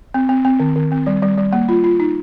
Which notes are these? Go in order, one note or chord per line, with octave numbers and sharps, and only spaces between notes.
C4
C4
C4
D#3
D#3
C4
G3
G3
G3
A#3
F4
F4
D#4